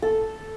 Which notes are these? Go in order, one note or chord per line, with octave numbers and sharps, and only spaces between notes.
A4